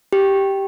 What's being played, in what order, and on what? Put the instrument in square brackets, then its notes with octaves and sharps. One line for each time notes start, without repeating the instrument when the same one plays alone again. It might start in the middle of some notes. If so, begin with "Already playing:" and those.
[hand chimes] G4